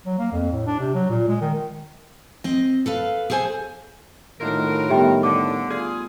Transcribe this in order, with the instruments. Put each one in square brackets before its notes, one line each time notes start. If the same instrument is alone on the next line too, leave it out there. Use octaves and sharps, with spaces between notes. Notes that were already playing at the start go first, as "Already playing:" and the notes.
[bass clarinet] F#3
A#3
F2
A2
D4
C3
F#3
A#2
G#3
D#3
[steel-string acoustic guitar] C4 D#5
A4 B4 F5
G#4 A4 C5 F5 G#5
[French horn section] A2 D#3 [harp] A3 D4 D#4 [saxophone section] F4 F#4 A#4
[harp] G3 B3 [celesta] G4 E5 G5
[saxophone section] D3 [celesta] D6
[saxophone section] F4 G#4